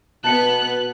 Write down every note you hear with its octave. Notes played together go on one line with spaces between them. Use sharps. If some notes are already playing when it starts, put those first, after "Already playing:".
B2 B3 A5 F#6 C#7